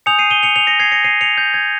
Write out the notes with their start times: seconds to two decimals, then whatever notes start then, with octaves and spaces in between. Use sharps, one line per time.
0.06 G#5 D#6 G6 C#7 F7
0.19 C7 D#7
0.30 D#7 G7
0.43 C#7 F7
0.56 C#7 F7
0.67 A#6 C#7
0.80 G#6 C7
0.92 A#6 C#7
1.04 C7 D#7
1.21 C#7 F7
1.38 G6
1.54 G#6